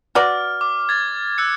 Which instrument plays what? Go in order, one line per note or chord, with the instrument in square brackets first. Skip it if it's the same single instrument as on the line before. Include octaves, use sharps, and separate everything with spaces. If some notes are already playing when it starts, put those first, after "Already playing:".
[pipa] F#4 B4 D5 [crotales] F6
[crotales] D6
G#6 A6
E6 F#6 C#7